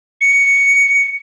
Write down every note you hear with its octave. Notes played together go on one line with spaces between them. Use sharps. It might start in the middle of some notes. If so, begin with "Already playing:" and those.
C#7